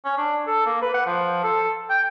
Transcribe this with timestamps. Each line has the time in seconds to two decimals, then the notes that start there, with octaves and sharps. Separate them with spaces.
0.05 C#4
0.18 D4
0.47 A4
0.66 A#3
0.82 B4
0.94 F#5
1.06 F3
1.44 A4
1.90 G5